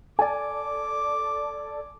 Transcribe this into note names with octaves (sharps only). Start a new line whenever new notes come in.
A4 D5 G#5 D6